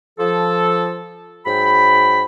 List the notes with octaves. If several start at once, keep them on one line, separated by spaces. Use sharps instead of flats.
F3 A4
G#2 F#3 G5 B5